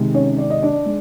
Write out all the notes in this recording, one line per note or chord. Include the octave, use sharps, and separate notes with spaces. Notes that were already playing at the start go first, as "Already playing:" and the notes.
Already playing: C3 D#3 G#3
C#4 C#5
D5
D#5
D4 D5
G#3